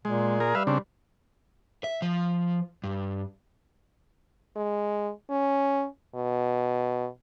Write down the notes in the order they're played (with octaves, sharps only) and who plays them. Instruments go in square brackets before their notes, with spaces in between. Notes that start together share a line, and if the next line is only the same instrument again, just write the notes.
[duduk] A#2 [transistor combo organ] G#3
[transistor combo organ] G#4 A#4
[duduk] G3 [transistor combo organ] B4 E5 F5
[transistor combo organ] C#3 C4 D4
[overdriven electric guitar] E5
F3
G2
[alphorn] G#3
C#4
B2